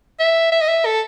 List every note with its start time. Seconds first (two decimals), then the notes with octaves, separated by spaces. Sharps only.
0.19 E5
0.52 E5
0.61 D#5
0.69 E5
0.86 A4